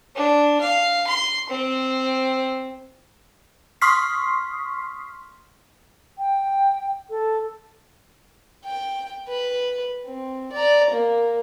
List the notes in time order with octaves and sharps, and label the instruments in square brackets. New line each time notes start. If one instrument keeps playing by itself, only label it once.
[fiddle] D4
F5
C6
C4
[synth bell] C6 C#6 D#6 F6 B6 C7
[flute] G5
A4
[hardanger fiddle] G5
B4
C4
D5 A#5
A#3